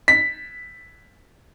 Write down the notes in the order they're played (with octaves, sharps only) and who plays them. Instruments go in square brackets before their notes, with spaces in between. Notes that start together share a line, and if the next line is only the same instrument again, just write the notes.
[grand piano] B6